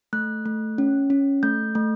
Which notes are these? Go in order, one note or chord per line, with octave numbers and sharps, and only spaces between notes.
A3 F#6
A3
C#4
C#4
A3 G6
A3